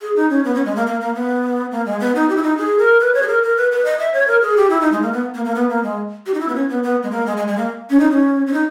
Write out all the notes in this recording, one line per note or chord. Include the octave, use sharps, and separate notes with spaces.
G#4
D#4
C#4
B3
C#4
G#3
A#3
A#3
A#3
B3
A#3
G#3
B3
D#4
G4
E4
D#4
G#4
A#4
B4
C#5
G#4
A#4
A#4
B4
B4
D#5
E5
C#5
A#4
G#4
G4
E4
D#4
G#3
A#3
B3
A#3
A#3
B3
A#3
G#3
G4
D#4
E4
B3
C#4
B3
B3
G#3
A#3
G#3
G#3
G#3
A#3
C#4
D#4
C#4
C#4
D#4